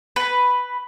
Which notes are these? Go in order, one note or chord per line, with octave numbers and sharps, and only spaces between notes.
B4